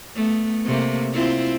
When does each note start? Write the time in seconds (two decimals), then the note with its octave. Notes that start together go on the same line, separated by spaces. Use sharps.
0.15 A3 B3
0.65 C3 A3 A#3
1.13 C4 E4 F4